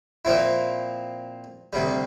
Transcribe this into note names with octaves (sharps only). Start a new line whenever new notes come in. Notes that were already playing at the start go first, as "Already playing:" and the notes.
A#2 F3 C4 E4
D2 C3 G3